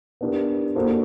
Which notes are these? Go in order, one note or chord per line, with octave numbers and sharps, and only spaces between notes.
B3 D4 G4 A#4
A#3 D4 F#4 A4 C5